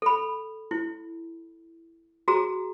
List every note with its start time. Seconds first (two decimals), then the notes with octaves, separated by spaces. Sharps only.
0.02 A4 B5
0.71 E4
2.28 F#4 G#4 A#5